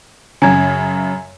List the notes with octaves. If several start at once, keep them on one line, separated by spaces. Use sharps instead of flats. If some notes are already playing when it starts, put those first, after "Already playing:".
F#2 C#3 G#5 A#5 G#6